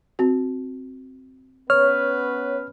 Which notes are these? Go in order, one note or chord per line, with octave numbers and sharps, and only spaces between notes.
C4 F#4
B3 C#4 B4 C#5 F6